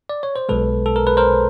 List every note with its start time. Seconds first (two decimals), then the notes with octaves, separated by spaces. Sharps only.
0.09 D5
0.23 C#5
0.36 C5
0.49 B1 B2 G#3 A4 B4
0.86 A4
0.96 A#4
1.07 B4
1.17 A#4 C5